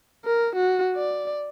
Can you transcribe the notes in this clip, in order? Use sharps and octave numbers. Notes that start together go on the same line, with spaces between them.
A#4
F#4
D5